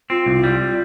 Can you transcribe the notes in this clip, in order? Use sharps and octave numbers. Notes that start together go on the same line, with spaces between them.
C4 F4
C2
G3